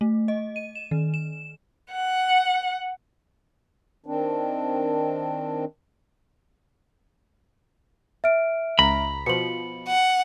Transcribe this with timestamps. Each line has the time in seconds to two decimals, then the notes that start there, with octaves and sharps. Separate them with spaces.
0.01 A3
0.28 D#5
0.56 D#7
0.75 E7
0.91 D#3
1.14 E7
1.91 F#5
4.06 D#3 C4 D4
8.24 E5 F6 D7
8.79 C#2 A#5 B5
9.26 B2 F3 C#7 F#7
9.88 F#5